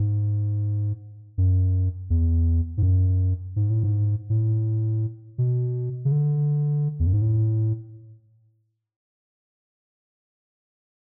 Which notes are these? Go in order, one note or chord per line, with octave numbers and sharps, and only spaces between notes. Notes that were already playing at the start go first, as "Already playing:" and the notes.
Already playing: G#2
F#2
E2
G#2
F#2
G#2
A2
G#2
A2
B2
C#3
D3
E2
F#2
G#2
A2